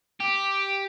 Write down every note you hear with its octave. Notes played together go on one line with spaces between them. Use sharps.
G4